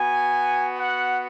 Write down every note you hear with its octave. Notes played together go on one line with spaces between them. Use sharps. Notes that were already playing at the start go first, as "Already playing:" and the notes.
Already playing: B3 F#4 G#5
F#5